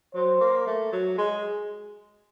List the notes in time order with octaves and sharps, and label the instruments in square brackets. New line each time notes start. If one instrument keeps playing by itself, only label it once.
[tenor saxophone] F#3 [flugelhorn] C5
[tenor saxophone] A#3
A3
F#3
G#3